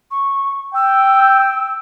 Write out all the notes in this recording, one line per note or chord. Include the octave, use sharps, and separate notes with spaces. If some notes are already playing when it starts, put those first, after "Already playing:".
C#6
G5 E6